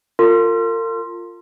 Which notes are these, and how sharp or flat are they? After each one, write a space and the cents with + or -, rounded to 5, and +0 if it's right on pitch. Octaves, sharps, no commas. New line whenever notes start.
F4 +0 A#4 -45